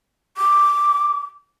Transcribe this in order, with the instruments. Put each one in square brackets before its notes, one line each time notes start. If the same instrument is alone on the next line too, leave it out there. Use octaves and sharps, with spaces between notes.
[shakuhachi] D6